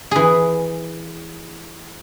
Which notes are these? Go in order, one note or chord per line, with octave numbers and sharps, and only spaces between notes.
E3 G#4